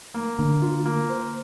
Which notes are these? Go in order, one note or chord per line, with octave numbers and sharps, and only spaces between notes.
A#3
D3 A#3
F4
A#3
C5